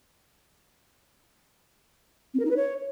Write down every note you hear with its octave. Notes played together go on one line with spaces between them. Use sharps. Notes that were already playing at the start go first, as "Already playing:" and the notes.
C4
A#4
D#4
B4
C#5